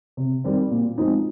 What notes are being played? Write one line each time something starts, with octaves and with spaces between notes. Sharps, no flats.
C3
D#3 G3 C4
A#2
F3 G#3 C4 D#4